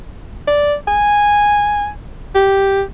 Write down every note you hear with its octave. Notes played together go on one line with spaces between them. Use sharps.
D5
G#5
G4